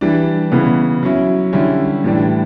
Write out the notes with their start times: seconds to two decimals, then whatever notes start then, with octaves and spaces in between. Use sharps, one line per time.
0.01 E3 G3 D4
0.52 C#3 E3 B3
1.03 F#3 C#4 E4
1.53 D3 G3 C#4 E4
2.04 A2 E3 G3 D4